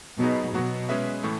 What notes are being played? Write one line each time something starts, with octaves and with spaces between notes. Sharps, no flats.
B2 F#3 B3 D#4 G#4
B2 F#3 B3 F#4
G#3 C#4 G#4 B4 E5
A2 E3 A3